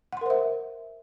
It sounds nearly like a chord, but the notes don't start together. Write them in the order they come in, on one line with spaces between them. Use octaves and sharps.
F#5 C6 A#4 C5 E5